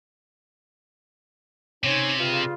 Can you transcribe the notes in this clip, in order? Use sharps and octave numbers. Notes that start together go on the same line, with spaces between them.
C3 C#4 D#4 C#5
G2 C#3 F4